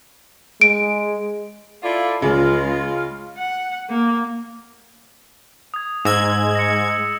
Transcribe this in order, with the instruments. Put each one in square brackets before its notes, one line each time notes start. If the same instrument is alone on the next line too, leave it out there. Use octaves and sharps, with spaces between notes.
[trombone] G#3 [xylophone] D7
[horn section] E4 A4 D5 [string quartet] F4
[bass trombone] C#2 [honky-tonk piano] C#3 [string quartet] G#3 [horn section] F4
[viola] F#5
A#3
[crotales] D#6 G#6
[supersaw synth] G#2 G#6 [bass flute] G#3 [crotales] E6 A#6 E7
[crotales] A#6 C#7